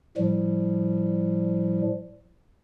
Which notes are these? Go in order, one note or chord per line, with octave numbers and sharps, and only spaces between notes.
A2 F3 G3